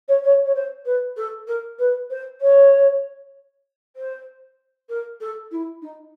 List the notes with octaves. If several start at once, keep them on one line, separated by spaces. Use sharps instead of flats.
C#5
C#5
C#5
C5
B4
A4
A#4
B4
C5
C#5
C5
A#4
A4
E4
D#4